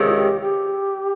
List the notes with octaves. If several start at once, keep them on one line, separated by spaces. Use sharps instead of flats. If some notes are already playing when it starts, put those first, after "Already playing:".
Already playing: C#2 C3 D#3
F4
G4
G4